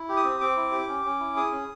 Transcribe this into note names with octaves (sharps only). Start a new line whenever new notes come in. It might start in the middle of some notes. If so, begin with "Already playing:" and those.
Already playing: E4
G4
D#6
C4
C4 D6
E4
G4
C#4
C#4
E4
G#4 D#6
C#4